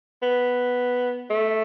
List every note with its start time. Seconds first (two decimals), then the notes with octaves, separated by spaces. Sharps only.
0.23 B3
1.30 A3